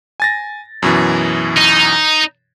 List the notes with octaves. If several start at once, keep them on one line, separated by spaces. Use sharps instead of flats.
G#5 A6 A#6
F#2 B2 E3
D#4